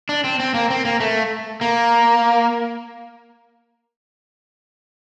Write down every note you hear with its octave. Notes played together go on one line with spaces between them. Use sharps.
D4
C4
C4
A#3
C4
A#3
A3
A#3